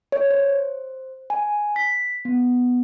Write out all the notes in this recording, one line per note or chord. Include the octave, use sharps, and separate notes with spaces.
C#5
C5
G#5
B6
B3